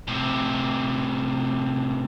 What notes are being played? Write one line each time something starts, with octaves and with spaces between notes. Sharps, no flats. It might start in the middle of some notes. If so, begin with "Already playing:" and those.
A2 C3